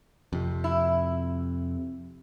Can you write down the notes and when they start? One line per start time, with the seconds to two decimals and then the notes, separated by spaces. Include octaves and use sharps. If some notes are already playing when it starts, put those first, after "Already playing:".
0.33 F2 C3
0.64 E4